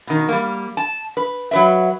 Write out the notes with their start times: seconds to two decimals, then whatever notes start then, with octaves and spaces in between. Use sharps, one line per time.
0.07 B2 D#3
0.29 G3 A#3
0.77 A5
1.17 B4
1.51 F#3 B4 E5